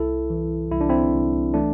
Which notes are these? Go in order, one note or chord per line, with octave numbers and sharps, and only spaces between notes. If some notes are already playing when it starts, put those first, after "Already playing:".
Already playing: C2 E4 A4
E3
C2 E4
D4
C4 E4
C2
E3 A3 D4